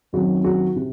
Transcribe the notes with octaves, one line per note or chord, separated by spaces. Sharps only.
F#2 D#3 F#3 C4 F#4
F#4
C3